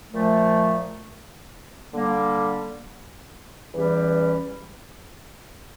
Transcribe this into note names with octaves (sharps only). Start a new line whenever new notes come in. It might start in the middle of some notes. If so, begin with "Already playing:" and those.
A#2 F3 A3
D3 G3 A#3
E2 E3 G3 C#4 G4